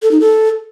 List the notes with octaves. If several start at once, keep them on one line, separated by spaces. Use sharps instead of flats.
A4
D#4
A4